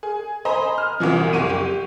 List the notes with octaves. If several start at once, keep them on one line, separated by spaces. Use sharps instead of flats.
G#4
C5 D#5 G#5 A#5 B5
F6
C2 B2 E3 F3
F#1 C2 C#6 D#7
G4